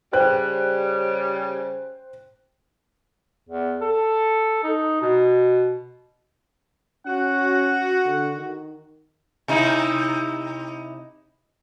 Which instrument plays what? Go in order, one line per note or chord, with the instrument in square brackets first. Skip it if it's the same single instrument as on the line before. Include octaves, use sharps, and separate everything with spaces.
[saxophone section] C#3 G3 [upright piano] C5 G5 F#6
[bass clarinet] E2
A4
D#4
B2
[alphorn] C#4 [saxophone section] F#4 [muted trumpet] F#5
[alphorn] D3
D#3
[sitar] C3 D#4 E4